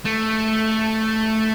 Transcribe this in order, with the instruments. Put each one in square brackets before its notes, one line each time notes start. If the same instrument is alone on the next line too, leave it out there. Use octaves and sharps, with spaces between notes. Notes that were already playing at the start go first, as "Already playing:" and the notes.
[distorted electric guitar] A3